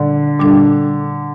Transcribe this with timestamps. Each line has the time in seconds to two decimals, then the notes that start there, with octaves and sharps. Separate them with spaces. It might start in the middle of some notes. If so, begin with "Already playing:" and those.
Already playing: A#2 D3 G3
0.39 A#2 G3 D4 A4